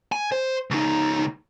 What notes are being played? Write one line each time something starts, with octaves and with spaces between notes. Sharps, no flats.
G#5
C5
C#2 D#4